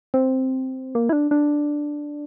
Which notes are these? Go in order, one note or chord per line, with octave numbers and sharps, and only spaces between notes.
C4
A#3
E4
D4
D4